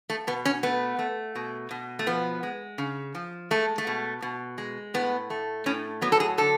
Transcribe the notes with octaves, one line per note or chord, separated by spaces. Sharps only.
A3
B2 B3
C#4
A3 B3
A3
B2
B2
A3
F3 B3
G#3
C#3
F3
G#3 A3
A3
B2
B2
G#3
A2 B3
A3
A2 C#4
F#3 B3
A4
G#4
D3 A4